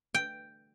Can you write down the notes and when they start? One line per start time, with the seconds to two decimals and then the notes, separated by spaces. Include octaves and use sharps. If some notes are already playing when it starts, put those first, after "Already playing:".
0.14 G5